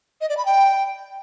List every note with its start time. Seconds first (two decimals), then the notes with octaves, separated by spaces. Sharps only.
0.21 D#5
0.29 D5
0.37 B5
0.45 G5